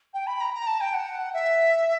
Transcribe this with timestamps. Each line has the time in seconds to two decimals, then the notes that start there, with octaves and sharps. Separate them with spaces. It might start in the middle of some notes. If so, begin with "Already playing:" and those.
0.13 G5
0.27 B5
0.40 A#5
0.53 A#5
0.67 A5
0.80 G5
0.93 F#5
1.34 E5